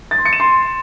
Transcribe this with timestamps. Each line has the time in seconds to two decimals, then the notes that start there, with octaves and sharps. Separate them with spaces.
0.11 A6
0.18 C6
0.25 C#7
0.33 E7
0.40 C6